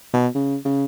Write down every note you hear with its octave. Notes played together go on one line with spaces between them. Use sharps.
B2
C#3
C#3